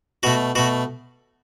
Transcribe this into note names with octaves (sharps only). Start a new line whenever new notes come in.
B2 A3 F#4
B2 A3 F#4